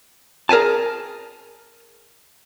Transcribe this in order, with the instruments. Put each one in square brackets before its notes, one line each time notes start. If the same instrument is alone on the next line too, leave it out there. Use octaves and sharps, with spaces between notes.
[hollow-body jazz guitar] G#4 A#4 E5 G#5 A5